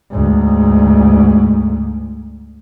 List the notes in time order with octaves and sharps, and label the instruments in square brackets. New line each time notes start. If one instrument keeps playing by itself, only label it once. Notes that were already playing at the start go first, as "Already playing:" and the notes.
[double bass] D2 G#2